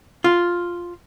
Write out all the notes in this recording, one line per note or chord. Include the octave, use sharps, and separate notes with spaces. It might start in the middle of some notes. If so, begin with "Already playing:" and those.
F4